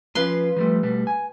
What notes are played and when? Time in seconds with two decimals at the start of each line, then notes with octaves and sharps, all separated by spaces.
0.15 F3 C#4 F4 B4 C6
0.57 F3 G3 A3
0.83 B2 G3 A3
1.07 G#5